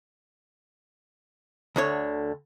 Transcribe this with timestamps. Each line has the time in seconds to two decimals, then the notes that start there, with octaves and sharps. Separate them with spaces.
1.76 D2 D3 C#5